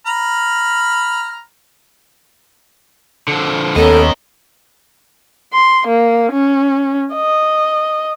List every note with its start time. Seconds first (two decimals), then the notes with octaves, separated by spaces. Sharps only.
0.07 A#5 B5 F6
3.28 D3 F3
3.76 D#2 B3 C#4 A4 A#4 D#5
5.53 C6
5.87 A#3
6.32 C#4
7.14 D#5